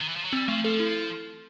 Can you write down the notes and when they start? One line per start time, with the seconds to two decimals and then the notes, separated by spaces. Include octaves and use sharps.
0.01 D#3
0.09 E3
0.16 F3
0.25 F#3
0.33 G3 C4
0.48 F3 A3
0.64 F3 A4
0.80 E4